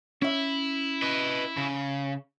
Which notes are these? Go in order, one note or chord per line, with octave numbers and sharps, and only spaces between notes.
C#4 E4 E5
B4 D#5
C#3